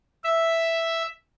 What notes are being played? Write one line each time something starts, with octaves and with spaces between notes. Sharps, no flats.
E5